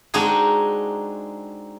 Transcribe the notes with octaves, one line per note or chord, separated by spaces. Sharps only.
G#3 C4 D4 D#4 F#4 G#4